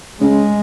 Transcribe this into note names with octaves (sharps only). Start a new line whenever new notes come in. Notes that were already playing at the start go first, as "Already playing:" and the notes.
C#3 G#3